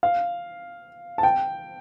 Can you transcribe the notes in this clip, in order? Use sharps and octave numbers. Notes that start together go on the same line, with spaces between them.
F5
A5
G5